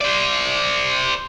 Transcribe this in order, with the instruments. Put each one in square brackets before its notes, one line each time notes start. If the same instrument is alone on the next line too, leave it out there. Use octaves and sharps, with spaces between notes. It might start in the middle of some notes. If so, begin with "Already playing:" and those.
[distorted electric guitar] C5 D5